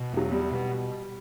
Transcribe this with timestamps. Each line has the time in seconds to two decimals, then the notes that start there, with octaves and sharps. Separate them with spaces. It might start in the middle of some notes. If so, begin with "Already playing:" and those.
Already playing: B2
0.13 E2 F#3
0.32 G3 B3
0.51 B2